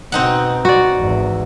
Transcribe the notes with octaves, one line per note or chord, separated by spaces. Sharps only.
B2 C4 D#4 F#5
F#4 D5
G#1 E2